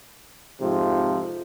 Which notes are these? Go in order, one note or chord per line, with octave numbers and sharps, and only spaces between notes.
F2 G#2 C3 F3